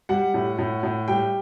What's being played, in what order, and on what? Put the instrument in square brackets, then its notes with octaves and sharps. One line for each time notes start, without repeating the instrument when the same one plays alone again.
[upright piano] G3 F#5
A2
A2
A2
G3 G5